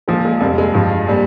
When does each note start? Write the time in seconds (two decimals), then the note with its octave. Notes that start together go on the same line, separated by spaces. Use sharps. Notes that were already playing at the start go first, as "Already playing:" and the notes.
0.08 A#2 F3 G#3
0.25 G#3
0.41 F2 C3 G3 A#3
0.58 G#3
0.74 G2 F3
1.07 A#2 G3